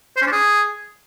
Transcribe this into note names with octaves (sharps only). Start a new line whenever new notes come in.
C5
C#4
D4
G#4